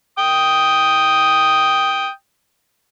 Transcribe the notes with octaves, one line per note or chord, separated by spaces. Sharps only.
G5 D#6